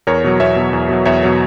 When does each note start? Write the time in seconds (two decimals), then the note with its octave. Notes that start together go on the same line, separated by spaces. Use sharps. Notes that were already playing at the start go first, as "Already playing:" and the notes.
0.07 E2 A#4 C#5
0.24 B2 F#3
0.40 E2 C#5 E5
0.56 B2 F#3
0.73 E2
0.89 B2 F#3
1.06 E2 C#5 E5
1.23 B2 F#3